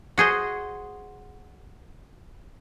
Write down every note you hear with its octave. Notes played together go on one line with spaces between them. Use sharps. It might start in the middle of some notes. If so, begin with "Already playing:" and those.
F#4 G#4 C5 D#5